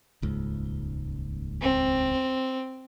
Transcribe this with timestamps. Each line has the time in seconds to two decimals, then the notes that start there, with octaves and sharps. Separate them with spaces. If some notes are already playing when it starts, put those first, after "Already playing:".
0.22 D#1 C#2 G#2
1.61 C4